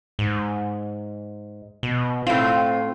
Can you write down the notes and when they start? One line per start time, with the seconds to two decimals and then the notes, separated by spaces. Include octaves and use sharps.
0.19 G#2
1.83 B2
2.27 A2 C4 F4